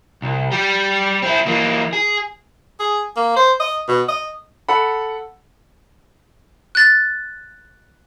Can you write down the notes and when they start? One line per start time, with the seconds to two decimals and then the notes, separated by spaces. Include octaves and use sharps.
0.22 C2
0.51 G3 G4
1.22 C4 E4
1.46 E3 A#3
1.93 G#4
2.80 G#4
3.17 A#3
3.36 C5
3.60 D#5
3.88 B2
4.09 D#5
4.69 A4 F#5 B5
6.75 F#6 A6